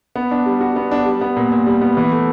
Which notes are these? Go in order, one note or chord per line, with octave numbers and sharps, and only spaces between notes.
B3
D4
G3
F#4
B3
D4
G3
B3
A#2
A#2
G3
B3
E3
A3